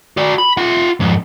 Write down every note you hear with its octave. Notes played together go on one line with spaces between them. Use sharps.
F#4 D5
B5
F4 F#5
F2 G#2